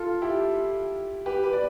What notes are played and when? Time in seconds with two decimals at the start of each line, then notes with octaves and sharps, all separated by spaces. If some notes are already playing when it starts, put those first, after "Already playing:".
Already playing: F4 A4
0.22 E4 G4
1.26 G4 B4
1.43 G4 B4
1.53 D5